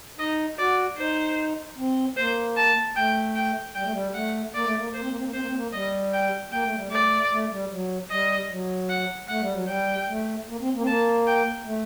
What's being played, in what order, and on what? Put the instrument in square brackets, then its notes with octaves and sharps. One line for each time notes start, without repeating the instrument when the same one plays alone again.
[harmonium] D#4 [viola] D#5
[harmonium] F#4 [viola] D5
[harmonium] D#4 [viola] C5
[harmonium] C4
[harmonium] A#3 [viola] C5
[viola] A5
[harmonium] A3 [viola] G5
[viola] G5
[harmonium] G3 [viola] G5
[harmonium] A3
G3
[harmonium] A3 [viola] F#5
[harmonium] A#3 [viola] D5
[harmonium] A3
A#3
[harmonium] A#3 [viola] C5
[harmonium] C4
A#3
C4
A#3
[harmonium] C4 [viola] C5
[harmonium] A#3
C4
A#3
[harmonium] G3 [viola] D#5
[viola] G5
[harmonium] A#3 [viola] G5
[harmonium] A3
G3
[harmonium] A3 [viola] D5
[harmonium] A3
G3
F#3
[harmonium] G3 [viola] D#5
[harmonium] F#3
[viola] F#5
[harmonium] A3 [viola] F#5
[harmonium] G3
F#3
[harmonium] G3 [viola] G5
[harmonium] A3
A#3
C4
A#3
C4
[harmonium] A#3 [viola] A5
[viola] G5
[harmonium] A3